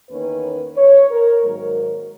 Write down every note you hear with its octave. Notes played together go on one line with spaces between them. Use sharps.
E2 D#3 A#3 C#4 B4
C#5
A#4
G#2 D#3 F#3 A#3 A#4